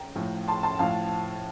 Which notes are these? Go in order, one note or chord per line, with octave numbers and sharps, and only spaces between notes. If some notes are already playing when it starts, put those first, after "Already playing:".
Already playing: G5 A#5
A2 F3
A5 C6
A5 C6
A2 F3 F5 A5